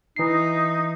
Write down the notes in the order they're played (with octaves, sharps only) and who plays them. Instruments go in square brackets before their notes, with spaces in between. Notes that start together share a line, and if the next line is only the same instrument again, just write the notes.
[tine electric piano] E3 C7 [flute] D#4